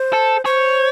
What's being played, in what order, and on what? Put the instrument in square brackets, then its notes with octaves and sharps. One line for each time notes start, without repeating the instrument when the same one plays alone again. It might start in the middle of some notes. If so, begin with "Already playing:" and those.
Already playing: [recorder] C5
[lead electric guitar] A4
[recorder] C5 [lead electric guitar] C#5